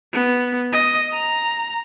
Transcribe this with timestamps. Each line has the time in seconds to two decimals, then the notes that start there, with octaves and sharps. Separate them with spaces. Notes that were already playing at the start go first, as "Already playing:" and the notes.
0.13 B3
0.73 D#5
1.12 A#5